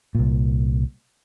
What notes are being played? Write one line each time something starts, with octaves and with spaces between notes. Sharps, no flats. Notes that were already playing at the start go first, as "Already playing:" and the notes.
C2 A#2